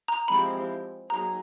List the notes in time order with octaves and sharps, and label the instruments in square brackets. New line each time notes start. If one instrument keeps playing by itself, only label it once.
[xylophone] A#5
[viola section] F3 G#3 C4 E4 G4 [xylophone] B5
[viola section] F#3 A#3 D#4 G#4 [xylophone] A#5